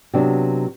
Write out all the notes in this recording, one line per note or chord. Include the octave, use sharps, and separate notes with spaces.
C3 F#3 B3 D4